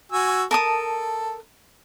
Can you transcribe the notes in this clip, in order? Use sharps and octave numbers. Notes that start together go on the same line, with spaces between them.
F#4 G#5 E6
A4 A#4 A5 D#6